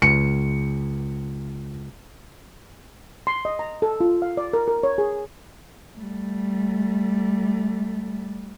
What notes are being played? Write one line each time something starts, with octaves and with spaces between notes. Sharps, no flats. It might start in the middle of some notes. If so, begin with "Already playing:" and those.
C#2 C#7
C6
D#5
A#5
A4
F4
F5
D5
A#4
A#4
C#5
G#4
G3 A3